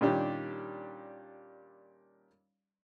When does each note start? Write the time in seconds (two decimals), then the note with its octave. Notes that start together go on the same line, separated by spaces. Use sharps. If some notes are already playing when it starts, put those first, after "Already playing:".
0.01 A#2 D#3 G3 C#4 D4 G4